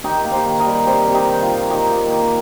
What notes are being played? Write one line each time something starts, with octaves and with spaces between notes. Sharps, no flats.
D#3 D#4 G4
A#3
G4 C5
D#3
A#4 D#5
G3
C3 G4 C5
C3
D#4 G4
D#3
F4
D#3
D#3 D#4 G4
A#3
D#3